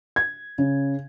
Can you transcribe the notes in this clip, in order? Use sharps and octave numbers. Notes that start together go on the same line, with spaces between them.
G#6
C#3